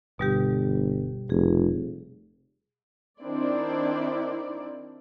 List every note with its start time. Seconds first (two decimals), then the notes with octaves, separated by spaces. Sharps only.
0.19 G1 B2 G3 G4
1.30 F1 G#4
3.21 D#3 C4 D4 E4 D5